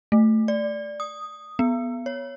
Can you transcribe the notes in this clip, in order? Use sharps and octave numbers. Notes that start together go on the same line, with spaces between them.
A3
D5
D#6
B3
C#5